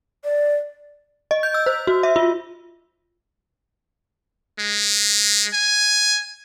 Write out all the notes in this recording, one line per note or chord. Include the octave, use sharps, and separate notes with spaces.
D5
D#5
G6
E6
C5
F#4
E5
F4
G#3
G#5